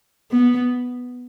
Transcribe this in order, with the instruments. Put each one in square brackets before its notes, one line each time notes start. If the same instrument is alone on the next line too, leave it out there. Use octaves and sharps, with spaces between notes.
[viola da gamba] B3